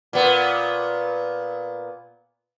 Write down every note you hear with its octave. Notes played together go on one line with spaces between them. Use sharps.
A#2 B3